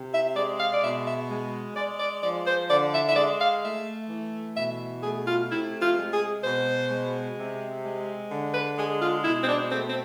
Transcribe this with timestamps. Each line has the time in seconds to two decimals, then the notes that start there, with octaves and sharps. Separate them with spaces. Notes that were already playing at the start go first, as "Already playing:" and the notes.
Already playing: C3
0.12 E5
0.35 G#3 D5
0.59 F5
0.72 D5
0.82 B2 E5
1.06 E5
1.29 G#3
1.75 G#3 D5
1.99 D5
2.22 F3 D5
2.46 C5
2.69 D3 D5
2.93 E5
3.09 E5
3.15 G#3 D5
3.39 F5
3.63 A3 E5
4.09 E3
4.56 B2 E5
5.03 A3 G#4
5.26 F4
5.49 C3 E4
5.81 F4
5.96 G#3
6.11 G#4
6.43 B2 C5
6.90 G#3
7.36 C3
7.83 G#3
8.30 D3
8.53 B4
8.76 G#3 G#4
9.00 F4
9.23 B2 E4
9.41 C4
9.48 D4
9.70 A3 C4
9.87 C4